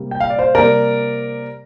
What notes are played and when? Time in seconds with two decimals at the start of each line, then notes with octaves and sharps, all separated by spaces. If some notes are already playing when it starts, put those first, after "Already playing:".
Already playing: C3 G3 A#3
0.11 G5
0.20 F5
0.30 D5
0.39 C5 F5
0.55 C3 G3 A#3 A#4 D5